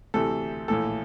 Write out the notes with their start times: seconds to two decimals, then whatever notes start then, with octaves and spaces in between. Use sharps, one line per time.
0.14 D2 C3 E3 A4
0.68 A#1 A2 E3 A4